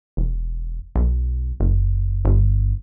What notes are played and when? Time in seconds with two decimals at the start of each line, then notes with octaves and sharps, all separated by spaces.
0.17 E1
0.96 B1
1.60 F#1
2.25 G1